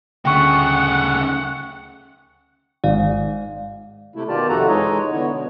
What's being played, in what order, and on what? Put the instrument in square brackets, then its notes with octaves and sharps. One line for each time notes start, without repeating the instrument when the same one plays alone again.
[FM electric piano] D2 [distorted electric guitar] C#3 A3 [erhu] F#5 [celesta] G5 C#6
[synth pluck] G#1 [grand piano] G#2 [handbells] D5 F5
[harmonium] C3 A3 E4
B2 D#3 F4 G4 D5 A5
F2 C3 F#4 A4 F#5 A#5
E3 G#3 D#4 C#5 D#5
D3 B3 E4 C#5
B2